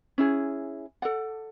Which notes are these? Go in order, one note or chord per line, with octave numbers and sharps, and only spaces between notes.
C#4 E4 G#4
A4 D5 F#5